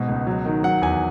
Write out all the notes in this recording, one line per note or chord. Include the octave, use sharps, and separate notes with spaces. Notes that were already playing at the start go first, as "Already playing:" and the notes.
Already playing: G#2 B2
C#2
F#3
D#3
F#3 F#5
E2 G#5